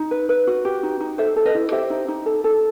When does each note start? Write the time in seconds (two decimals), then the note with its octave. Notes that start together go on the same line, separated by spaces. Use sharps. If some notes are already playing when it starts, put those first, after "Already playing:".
Already playing: D#4
0.11 B4
0.29 B4
0.47 F#4
0.65 G4
0.83 D#4
1.01 D#4
1.18 A4 C5 E5
1.36 A4
1.46 B4 D#5
1.55 E4
1.72 G4 C5 E5
1.90 D#4
2.08 D#4
2.26 A4
2.44 A4